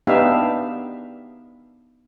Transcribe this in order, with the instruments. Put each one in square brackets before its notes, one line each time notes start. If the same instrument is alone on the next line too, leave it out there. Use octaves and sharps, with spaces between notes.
[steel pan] B3 D4 D#4 G4 E5 F5